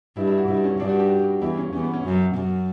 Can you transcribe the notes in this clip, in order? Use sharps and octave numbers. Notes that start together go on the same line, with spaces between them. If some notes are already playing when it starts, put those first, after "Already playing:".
G2 E4
E4
F#4
G2 E4
C#4
G2 D4
F#4
G4
F#4
E2 E4
C#4
E2 C#4
B3
C#4
F#2
F#2